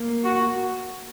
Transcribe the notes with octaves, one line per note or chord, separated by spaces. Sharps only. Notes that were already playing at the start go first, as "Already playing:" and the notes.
Already playing: A#3
F#4